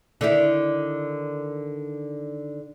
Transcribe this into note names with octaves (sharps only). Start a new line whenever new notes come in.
D3 D#3 E4